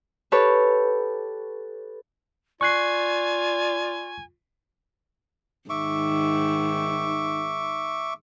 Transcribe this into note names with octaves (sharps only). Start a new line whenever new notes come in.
G4 A4 B4 C#5
F4 D5 G#5 C#6 F#6 C7
G#2 D#3 E5 C#6 D6